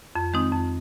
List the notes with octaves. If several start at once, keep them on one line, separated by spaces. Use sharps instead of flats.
F2
D#3 G#3 C4 D#4
F2